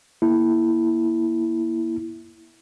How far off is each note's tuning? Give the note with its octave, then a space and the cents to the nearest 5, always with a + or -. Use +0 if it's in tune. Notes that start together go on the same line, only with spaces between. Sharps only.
A#3 +20 E4 +0